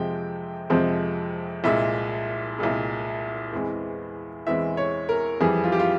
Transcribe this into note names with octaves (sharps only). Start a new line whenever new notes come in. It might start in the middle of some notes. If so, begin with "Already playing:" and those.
Already playing: F2 C3 F3 G#3 C4 G5
F2 C3 F3 G#3 C4
C2 A#2 G#3 E5
C2 A#2 G#3
E2 E3 G#3 C4
E2 E3 G#3 C4 E5
C#5
A#4
F2 E3 G3 G#4
F4
G4
F4